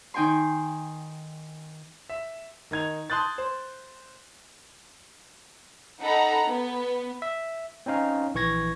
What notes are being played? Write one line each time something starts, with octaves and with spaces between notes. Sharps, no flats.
D#3 D#4 G5 G#5 C6
E5
D#3 D#4 G#6 F7
A5 C6 D#6 F#6 G6 A6
C5
D#4 A4 F#5 A#5 B5
B3
E5
C4 C#4 D#4 F5
A#1 E3 C#6 G#6 A#6